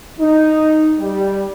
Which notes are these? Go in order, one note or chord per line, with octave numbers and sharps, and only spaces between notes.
D#4
G3